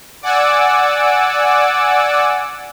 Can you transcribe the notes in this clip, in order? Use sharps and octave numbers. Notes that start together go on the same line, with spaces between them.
D5 F#5 G#5 D6 E6